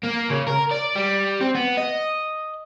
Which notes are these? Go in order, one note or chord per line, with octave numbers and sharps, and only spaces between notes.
A#3
C#3
A#4
D5
G3
C4
B3
D#5